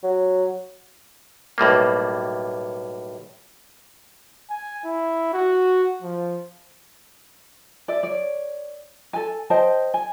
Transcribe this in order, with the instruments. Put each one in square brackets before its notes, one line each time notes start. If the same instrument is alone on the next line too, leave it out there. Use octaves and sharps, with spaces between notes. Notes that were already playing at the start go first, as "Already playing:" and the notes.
[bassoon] F#3
[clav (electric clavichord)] B1 A2 G3 A#3
[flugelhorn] G#5
E4
F#4
F3
[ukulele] D5 E5
C#5 D5
A4 G#5
C5 D#5 G5 A5
G#5